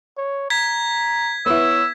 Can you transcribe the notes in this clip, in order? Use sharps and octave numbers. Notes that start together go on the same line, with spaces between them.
C#5
A#5 G#6 B6
B3 E4 C#5 E6